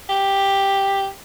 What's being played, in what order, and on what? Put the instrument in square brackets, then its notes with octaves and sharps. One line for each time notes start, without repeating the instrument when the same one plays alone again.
[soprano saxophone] G4